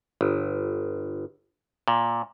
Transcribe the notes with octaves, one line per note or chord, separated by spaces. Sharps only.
G1
A#2